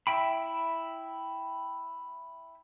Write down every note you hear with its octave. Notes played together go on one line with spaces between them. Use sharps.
E4 E5 G5 B5